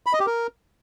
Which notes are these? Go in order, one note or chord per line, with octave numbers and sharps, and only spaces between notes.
B5
D#5
G4
A#4